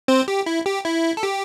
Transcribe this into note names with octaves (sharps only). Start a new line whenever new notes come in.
C4 C5
G4
E4
G4
E4
A4
G4